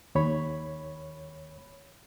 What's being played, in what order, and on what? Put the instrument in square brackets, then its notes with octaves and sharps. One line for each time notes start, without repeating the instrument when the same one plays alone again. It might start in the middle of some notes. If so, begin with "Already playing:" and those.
[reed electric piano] D#2 C#5 B5